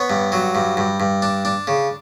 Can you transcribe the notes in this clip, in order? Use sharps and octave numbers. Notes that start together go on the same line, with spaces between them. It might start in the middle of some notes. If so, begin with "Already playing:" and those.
Already playing: B3 C#5
G2
F#3
G2
G2
G2
D4
D4
C#3